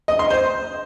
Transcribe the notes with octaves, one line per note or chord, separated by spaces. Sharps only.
D#5
C6
C5